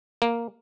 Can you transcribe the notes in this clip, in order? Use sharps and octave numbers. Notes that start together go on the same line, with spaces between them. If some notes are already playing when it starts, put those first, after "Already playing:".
A#3